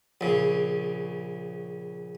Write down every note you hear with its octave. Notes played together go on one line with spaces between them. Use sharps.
A#1 C#3